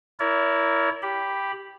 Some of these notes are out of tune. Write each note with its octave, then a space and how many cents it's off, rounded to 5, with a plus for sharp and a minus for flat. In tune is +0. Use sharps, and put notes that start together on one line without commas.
E4 +0 A#4 +0 C#5 +45
G4 +0 B5 +0